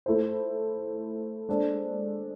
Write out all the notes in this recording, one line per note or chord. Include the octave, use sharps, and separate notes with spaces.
A3 E4 A4 C5
G#3 D4 A4 C5